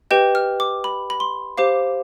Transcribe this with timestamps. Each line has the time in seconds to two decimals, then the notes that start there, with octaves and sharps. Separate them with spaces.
0.11 G4 B4 D#5 G5 G6
0.35 F6
0.60 D6
0.84 B5
1.10 B5
1.20 C6
1.58 G4 C5 F5 D6